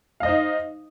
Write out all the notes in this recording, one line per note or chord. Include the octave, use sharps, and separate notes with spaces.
D#4 C5 D#5 F5